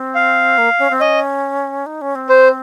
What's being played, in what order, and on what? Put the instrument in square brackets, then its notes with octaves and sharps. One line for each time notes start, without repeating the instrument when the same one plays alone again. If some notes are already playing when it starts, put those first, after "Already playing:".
Already playing: [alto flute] C4
[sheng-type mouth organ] F5
[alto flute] A#3
C#4
C4
[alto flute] C#4 [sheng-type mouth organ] D#5
[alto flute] D#4
C#4
C4
[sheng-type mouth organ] C5